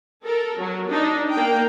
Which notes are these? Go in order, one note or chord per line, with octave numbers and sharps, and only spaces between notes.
A4 A#4
F#3
D4 D#4
A#3 G5